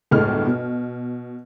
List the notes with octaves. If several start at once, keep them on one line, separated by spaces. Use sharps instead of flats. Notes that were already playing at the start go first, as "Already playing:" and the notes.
G1 D2 A2 G#3 F6
B2